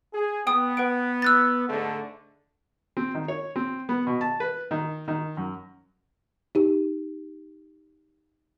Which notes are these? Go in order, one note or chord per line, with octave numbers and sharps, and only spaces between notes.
G#4
B3 G5 D#6
B4 F#5 D7
E6 F#6 A6
G#2 D3 A3
C4
D#3
C#5
C4
B3
B2
A5
B4
D#3
D#3
F#2
D#4 G4